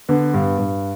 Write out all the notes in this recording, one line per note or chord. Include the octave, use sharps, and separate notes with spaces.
D3 B3
G2
G2